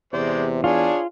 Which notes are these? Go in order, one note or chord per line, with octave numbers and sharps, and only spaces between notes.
E2 C3 G#3 C5 D5
D4 F4 G#4 C#5 G#5